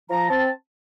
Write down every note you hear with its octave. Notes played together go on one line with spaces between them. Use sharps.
F3 A#5
C4 A5